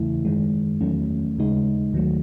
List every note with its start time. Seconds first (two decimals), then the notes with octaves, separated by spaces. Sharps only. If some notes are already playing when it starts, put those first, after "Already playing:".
Already playing: E2 C#3 E3 A3 E4
0.25 F#2 D#3 G#3
0.81 E2 D#3 F#3 A3 C#4
1.37 D#2 C#3 G#3 D#4
1.93 D#2 D#3 F#3 A3